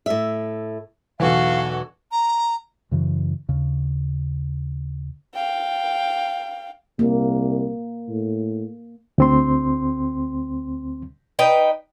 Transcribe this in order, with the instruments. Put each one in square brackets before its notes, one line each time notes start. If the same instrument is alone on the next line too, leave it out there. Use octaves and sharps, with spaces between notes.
[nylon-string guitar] A2 E5
[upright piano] B1 E2 E3 [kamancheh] F#4 A4 [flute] F5
[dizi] A#5
[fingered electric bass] F#2 C#3 E3
D#2 C#3
[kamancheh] F5 G5
[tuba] C2 [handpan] A#3
[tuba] A2
[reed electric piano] D2 C4 C6
[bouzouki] D#4 B4 G5